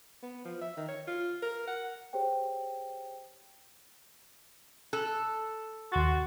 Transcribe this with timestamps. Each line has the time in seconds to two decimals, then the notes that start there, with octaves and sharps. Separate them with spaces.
0.23 B3
0.45 F3
0.61 E5
0.77 D#3
0.88 C#5
1.07 F4
1.42 A#4
1.67 F#5
2.13 G4 G#4 C5 C#5 G5
4.93 A4 F#6
5.92 D#2 F#4 C6 A6